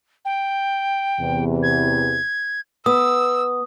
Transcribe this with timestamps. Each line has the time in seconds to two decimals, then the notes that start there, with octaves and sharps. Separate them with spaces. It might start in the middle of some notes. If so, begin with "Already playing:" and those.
0.25 G5
1.19 E2 C3
1.62 G#6
2.86 B3 D#6 E6